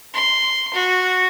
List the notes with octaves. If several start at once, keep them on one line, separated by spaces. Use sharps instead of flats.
C6
F#4